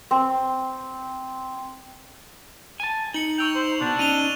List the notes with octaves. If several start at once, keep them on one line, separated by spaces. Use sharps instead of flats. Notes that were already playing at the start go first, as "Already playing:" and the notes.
C4
G#5 A5
D#4 C#7 F#7
G5 C#6 E6 F7
C5
B2 D4
C#4 D#4 D#7 F7 G7